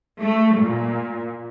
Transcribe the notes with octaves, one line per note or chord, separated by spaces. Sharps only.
A3
A#2